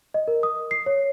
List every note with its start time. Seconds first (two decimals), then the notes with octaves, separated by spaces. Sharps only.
0.14 D#5
0.28 A#4
0.43 D#6
0.71 C7
0.86 C#5